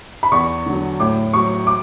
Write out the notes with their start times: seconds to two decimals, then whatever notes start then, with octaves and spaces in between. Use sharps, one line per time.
0.23 B5
0.32 E2 C#6
0.66 D3 F#3
1.00 A2 D6
1.33 F#3 C#6
1.67 D6